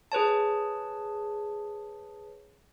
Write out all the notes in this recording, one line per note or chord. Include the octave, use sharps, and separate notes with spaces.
G#4 B4 C#5 A5